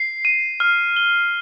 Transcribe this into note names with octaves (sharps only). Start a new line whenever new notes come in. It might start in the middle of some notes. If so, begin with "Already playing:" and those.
Already playing: C7
D#7
F6
G7